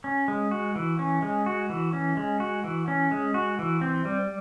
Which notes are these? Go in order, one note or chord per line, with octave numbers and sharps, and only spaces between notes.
C#4
G#3
F#4
E3
C#4
G#3
F#4
E3
C#4
G#3
F#4
E3
C#4
G#3
F#4
E3
C4
G3